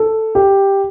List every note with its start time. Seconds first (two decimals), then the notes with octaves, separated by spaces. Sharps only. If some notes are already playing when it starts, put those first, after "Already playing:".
Already playing: A4
0.35 G4